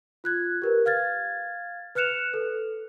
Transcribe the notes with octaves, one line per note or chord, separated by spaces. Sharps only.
F4 F#6 G#6
G4 A#4 B4
F5 F6 G#6 A6
B4 F6 F#6 C#7 E7 F7
A4